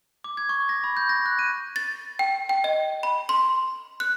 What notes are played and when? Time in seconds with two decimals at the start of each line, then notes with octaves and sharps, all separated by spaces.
0.24 D6
0.37 G#6
0.49 C#6
0.69 A#6
0.84 B5
0.97 G6
1.09 A#6
1.26 F#6
1.39 D#7
1.76 A6
2.19 G5
2.49 G5
2.64 D#5
3.03 B5
3.29 C6
4.00 F#6